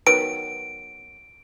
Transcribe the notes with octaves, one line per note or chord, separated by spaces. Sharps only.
D#3 F#3 B3 D7